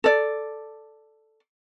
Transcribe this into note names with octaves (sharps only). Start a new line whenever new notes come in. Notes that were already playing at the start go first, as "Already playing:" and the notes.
A4 D5